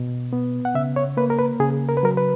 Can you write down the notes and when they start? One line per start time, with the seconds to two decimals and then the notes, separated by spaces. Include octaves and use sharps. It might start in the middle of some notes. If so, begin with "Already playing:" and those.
Already playing: B2
0.33 B3
0.65 F#5
0.75 C#3 E5
0.96 C#5
1.17 A#3 B4
1.30 A#4
1.39 B4
1.60 C#3 G#4
1.89 A#4
1.97 B4
2.03 F#3 A#4
2.17 B4